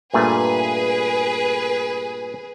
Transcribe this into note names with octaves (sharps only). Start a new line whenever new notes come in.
G2 A#2 A3 G#4 B4